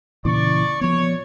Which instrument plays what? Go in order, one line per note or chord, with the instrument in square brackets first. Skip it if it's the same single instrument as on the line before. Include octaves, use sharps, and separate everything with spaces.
[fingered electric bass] A#2 C#3 E3 [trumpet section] D5 C#6
[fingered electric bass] F3 B3 [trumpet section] C#5